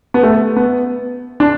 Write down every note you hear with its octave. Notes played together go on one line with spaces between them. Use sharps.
B3
A3
B3
D4